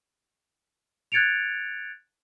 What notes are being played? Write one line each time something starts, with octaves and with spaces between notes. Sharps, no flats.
F#6 G#6 A6 C#7 D7 F7